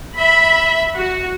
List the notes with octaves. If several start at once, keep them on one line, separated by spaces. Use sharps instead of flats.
E5 B5
F#4